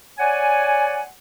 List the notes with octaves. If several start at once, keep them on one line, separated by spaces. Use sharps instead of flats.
C#5 D5 F#5 G#5